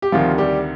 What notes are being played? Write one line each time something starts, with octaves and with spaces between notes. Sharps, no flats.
G4
D2 C3 D#3 F3 G3 F4
G3 G4